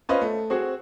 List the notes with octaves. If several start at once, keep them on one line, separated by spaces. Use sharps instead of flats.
C#4 F4 B4 C5 D#5
A3
C4 F#4 G#4